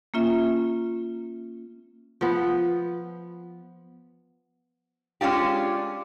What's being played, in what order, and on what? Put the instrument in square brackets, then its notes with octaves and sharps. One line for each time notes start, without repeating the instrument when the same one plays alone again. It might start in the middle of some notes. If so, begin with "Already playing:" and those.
[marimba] A#3 C#4 F4 E5
[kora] F3 B3
[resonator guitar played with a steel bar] G#3 C#4 D4 F4 G4